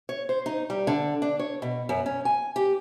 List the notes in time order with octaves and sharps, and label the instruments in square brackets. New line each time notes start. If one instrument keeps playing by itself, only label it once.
[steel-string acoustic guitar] C#5
C5
D#4
G3
D3
D4
C#5
B2
F#2
C#4
G#5
G4